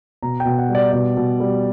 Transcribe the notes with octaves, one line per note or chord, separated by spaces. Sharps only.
B2 A#5
G5
B2
F#5
G3
D5
B2 D5
B2
G3